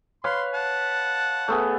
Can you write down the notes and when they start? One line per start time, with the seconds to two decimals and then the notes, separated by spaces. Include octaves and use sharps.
0.24 B4 C#5 F5 C6
0.54 F#5 A5
1.48 A3 B3 G#4